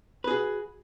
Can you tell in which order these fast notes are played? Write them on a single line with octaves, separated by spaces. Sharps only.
B4 G#4 F#4